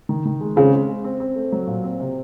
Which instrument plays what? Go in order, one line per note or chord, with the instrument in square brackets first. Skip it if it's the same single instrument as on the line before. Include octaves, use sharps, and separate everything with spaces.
[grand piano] D#3
D#3
G#3
[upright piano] C#3 [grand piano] C4
[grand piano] G#3
G#3
C4
C4
A3
F#3
A#2
C4
C3